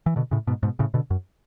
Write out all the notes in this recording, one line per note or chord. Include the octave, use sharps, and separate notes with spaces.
E3
B2 D3
A2 C#3
G#2 B2
G#2 B2
A2 C#3
B2 D3
F#2